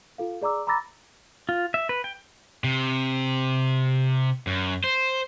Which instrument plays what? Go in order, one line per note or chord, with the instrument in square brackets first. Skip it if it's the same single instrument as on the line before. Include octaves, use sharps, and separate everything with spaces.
[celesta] F4 A4 F5
G#4 D5 A#5 D6 E6
A#5 B5 D6 E6 A6 A#6
[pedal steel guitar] F4
E5
B4
G5
[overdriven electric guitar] C3
F#2
C5